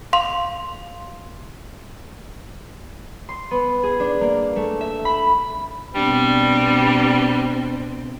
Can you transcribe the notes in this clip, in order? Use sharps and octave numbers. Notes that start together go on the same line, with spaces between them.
F5 C6 F7
C6
B3
G#4
D4
A#3
A3
E5
B5
B2 G3 C4 D4